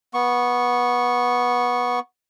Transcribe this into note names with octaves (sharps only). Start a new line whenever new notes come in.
B3 C#6